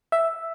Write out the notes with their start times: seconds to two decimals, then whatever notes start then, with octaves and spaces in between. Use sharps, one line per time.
0.12 E5